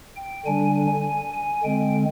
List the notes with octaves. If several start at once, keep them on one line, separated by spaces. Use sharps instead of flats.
G5
D3 G3 D4 G#5
G#5
G#5
D3 G#3 C4 G5